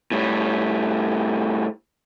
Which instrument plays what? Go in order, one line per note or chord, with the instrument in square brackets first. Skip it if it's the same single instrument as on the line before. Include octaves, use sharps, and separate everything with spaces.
[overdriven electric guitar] A2 G3